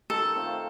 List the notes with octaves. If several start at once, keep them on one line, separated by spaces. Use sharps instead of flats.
D#3 A4
A3 C4 F4